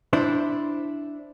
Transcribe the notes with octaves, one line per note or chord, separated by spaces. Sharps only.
D4 E4 C5